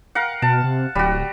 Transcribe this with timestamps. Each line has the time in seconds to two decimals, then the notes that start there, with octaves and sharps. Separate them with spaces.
0.15 A#4 F5 F#5
0.42 B2 A5
0.64 C3
0.95 D1 G3 F#4